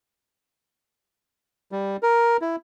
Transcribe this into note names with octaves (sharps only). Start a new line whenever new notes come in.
G3
A#4
E4